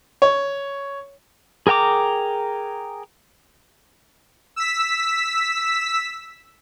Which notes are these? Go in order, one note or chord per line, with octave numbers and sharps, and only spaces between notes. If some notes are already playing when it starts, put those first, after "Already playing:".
C#5
G#4 A#4 G5 A#5 D6
E6 B6